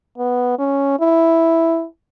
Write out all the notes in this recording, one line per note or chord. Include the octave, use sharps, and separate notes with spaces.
B3
C#4
E4